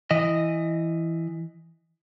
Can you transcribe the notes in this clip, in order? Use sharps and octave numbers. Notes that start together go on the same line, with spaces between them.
E3 D#5